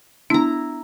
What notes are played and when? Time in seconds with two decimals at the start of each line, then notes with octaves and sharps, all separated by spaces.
0.30 B3 D4 E4 A#5